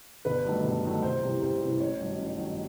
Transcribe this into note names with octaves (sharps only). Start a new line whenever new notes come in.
G1 B4
G2 D#3 F#3 A3
G1
G2 D#3 F#3 A3
C2 C5
C3 E3 G3
C2 C5
C3 E3 G3
A1 C#5
G2 D#3 F#3
A1
G2 D#3 F#3